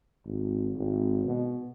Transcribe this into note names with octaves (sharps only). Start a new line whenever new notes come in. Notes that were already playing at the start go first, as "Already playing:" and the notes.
G#1
G#1
B2